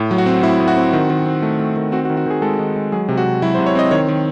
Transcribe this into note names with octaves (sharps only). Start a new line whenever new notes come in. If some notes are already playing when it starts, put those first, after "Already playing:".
Already playing: A2
F#3
F#4
C4
A2 E4
A2
F#4
C4
D#3
D#3
C4
A3
A3
D#3
C4 F#4
F#4
D#3
F#4
D#3 G#4
G#3 A4
D#3
G#3
F#3 G#4
C3
F#4
C3
F#3 E4
C5
C3
C#5
C4 D#5
D#3 C#5
D#3